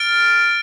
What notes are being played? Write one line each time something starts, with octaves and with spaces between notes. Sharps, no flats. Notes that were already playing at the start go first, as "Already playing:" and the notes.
Already playing: F6 A6 D7